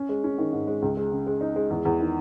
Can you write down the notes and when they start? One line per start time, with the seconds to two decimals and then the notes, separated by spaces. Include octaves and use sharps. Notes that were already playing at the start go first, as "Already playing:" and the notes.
Already playing: C#4
0.09 G#3
0.24 C#4
0.38 D#3
0.52 G#2
0.67 G#3
0.82 C#2
0.97 G#3
1.12 C#3
1.27 G#3
1.41 D#4
1.56 G#3
1.70 E2
1.85 E2
2.00 D#3